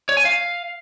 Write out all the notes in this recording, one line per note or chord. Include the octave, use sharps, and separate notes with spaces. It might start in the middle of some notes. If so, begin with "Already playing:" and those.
C#5
G#5
F5